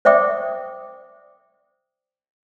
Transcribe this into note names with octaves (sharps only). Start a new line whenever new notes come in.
C5 D5 E5 G5 D6 D#6